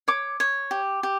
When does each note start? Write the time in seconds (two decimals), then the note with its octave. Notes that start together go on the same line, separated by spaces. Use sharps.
0.08 C#5 D6
0.40 C#5
0.71 G4
1.03 G4